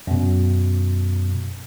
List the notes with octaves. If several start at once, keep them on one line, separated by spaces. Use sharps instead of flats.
F#2 B2